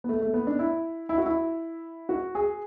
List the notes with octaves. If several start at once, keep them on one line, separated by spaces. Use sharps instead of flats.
B3
A3
A3
B3
D4
E4
E4
F#4
E4
F#4
G#4